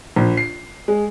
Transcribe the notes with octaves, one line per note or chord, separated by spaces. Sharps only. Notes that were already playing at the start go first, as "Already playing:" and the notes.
A#1
C7
G#3